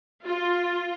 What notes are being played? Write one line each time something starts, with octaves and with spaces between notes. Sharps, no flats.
F4